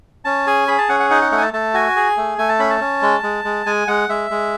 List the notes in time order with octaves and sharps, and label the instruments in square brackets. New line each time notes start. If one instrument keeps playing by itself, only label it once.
[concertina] C#4 A5
G#4 G#5
G#4 B5
A5
C#4 F#5
F#5
D#4 F#5
F#5
A3 F#5
G#5
A5
A3 A5
F#4 G#5
G#4
A3
A3 G#5
A5
C#4 B5
A5
C#4
G#3
G#3
G#3
G#3 G#5
G#3 F#5
G#3 E5
G#3